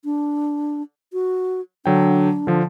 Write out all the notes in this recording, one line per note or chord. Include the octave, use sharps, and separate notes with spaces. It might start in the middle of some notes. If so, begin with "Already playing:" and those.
D4
F#4
D3 F#3 D4 G5
D3 F3